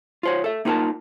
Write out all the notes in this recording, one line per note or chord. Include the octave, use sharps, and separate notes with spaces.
F4 C5 C#5
A4 E5
A#3 D#4 F4 G#4 A#4 A5